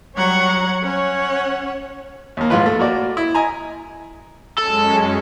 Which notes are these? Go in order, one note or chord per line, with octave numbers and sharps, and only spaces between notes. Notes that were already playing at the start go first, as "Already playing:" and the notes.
F#3 G3 C#5 F#5 A#5 G#6
C#4 C#5 F#5
D#2 A#3
G#2 F3 F4 B4
A3
A#3 F#4 D5
E4
D#5 G#5 A#5
F#2 G#3 C#4 A4